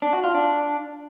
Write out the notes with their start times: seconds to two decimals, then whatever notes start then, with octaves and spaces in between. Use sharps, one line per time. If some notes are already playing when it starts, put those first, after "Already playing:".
0.02 D4
0.13 F#4
0.24 F4
0.34 D4